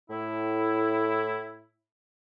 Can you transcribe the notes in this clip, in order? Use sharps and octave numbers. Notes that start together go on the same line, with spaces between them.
A2 E4